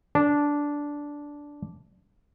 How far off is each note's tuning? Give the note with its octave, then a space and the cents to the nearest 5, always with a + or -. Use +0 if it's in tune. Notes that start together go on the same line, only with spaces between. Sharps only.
D4 -10